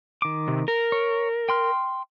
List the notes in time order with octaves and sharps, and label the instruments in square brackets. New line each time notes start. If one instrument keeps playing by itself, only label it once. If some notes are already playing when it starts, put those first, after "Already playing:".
[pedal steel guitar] D#3 D6
[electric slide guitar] C3
A#4
[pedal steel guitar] C#5
G5 C6 F6